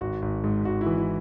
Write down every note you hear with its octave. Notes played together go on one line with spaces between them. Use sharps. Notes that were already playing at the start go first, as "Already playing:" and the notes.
G#1 F#4
G#1
G#2
G#1 F#4
E4
E3
E4